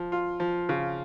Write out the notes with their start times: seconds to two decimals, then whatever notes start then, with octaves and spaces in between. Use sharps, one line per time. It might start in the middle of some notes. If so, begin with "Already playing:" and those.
Already playing: F3
0.12 F4
0.40 F3
0.69 C#3